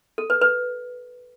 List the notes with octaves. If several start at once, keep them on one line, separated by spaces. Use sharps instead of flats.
A4
B4
B4